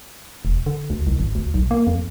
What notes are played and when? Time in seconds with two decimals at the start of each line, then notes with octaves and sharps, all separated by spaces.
0.45 E1
0.66 D3
0.90 D2
1.07 C2
1.19 G#1
1.35 D2
1.54 B1
1.71 A#3
1.87 F2